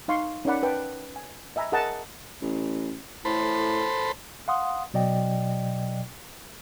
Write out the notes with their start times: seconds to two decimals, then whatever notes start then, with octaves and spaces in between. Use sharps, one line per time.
0.08 D#4 F5 C6 C#6
0.45 C#4 D#4 A#4 D5 F#5 B5
0.63 B4 G5 A5
1.16 G#5
1.56 D#5 E5 G#5 A#5 B5
1.72 G#4 A#4 D#5 F#5 A5
2.41 A1
3.25 A2 A4 C5 B5
4.48 F5 F#5 C6 D#6
4.94 B2 F#3 D5 D#5 G5